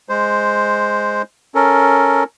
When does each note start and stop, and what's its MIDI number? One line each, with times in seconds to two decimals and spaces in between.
0.09 1.22 56
0.09 1.22 72
1.55 2.24 61
1.55 2.24 69
1.55 2.24 70